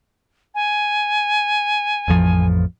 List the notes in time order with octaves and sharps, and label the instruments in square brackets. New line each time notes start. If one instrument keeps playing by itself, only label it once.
[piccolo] G#5
[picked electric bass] A1 F2 F3